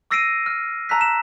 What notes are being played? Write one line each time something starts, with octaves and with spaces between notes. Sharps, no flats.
D6 E6 A#6 C7 D7 D#7
F6
A5 A#5 E6 F#6 B6
E7